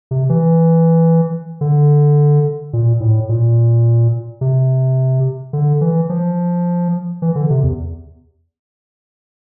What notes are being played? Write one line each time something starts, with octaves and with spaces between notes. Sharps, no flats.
C3
E3
D3
A#2
A2
A#2
C3
D3
E3
F3
E3
D3
C3
E2